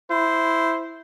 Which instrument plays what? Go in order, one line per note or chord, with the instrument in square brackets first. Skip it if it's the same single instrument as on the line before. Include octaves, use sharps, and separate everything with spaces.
[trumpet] E4 [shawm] C5